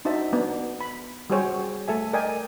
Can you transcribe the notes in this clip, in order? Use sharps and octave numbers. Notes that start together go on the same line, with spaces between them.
D4 D#4 F#4 C5 E5 A5
B3 D4
B5
G3 F#4 G#4 C5 C#5 G5
A3 A4 E5 G#5
A#4 D5 D#5 G5 G#5